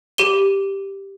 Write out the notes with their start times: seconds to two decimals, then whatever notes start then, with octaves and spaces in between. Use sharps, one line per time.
0.18 G4 D#7 G7